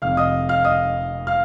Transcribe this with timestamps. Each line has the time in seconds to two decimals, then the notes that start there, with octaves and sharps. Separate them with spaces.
0.02 F1 F2 C3 F5 F6
0.17 D#5 D#6
0.49 F5 F6
0.64 D#5 D#6
1.27 F5 F6